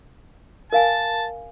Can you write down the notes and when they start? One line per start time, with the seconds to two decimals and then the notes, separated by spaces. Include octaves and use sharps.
0.73 A#4 F5 G#5 A5